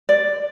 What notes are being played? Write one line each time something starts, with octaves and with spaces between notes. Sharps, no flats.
D5